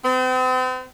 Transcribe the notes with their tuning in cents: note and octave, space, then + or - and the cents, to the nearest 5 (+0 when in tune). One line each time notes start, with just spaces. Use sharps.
C4 -40